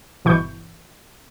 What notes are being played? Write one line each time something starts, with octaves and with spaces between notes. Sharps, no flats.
G1 B2 E3 C#6 G6